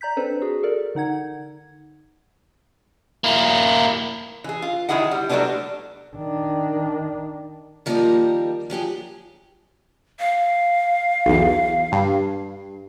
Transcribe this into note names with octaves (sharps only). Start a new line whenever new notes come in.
D5 A#5 G6 B6
C4 D4 A4 B4 C5 D5
F#4 G#4
A4 A#4 D5
D3 D#4 F#5 G#6
A#3 E4
E3 G#4
F4
D#3 F#3 E4 G#4 E5 F#5
G3
F#3 G3 A3 B3 C#4 D4
D#3 D4
D#3 F3 G3 A#3 A#4 D#5
F3 F#3 G4 G#4
F5
B1 E2
G2